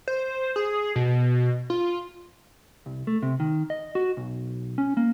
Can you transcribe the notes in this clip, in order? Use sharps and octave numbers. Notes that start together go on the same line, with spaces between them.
C5
G#4
B2
F4
C2
A3
C3
D#3
D#5
F#4
B1
C#4
A#3